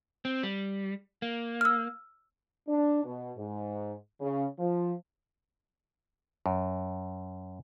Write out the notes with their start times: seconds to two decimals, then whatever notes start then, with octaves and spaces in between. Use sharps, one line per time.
0.25 C4
0.43 G3
1.22 A#3
1.61 E6 F6
2.68 D4
3.04 B2
3.37 G#2
4.20 C#3
4.59 F3
6.46 F#2